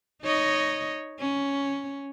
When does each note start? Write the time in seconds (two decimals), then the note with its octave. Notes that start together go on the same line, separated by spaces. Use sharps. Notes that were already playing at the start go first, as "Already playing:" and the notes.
0.22 D#4 C#5 D#5
1.19 C#4